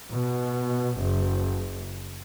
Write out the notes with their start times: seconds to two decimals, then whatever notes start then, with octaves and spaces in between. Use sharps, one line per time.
0.12 B2
0.99 F#1